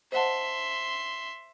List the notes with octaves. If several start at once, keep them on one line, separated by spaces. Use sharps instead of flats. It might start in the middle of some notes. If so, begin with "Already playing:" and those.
C5 D#5 E5 F#5 A5 C6